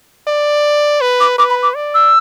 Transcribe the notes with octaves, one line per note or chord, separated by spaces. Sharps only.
D5
B4
D6
B4 D6
B5
D6
D5
E6